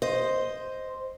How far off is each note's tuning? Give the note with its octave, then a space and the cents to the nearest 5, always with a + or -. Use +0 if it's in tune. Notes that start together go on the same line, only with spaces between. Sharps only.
C5 +0 D#5 +0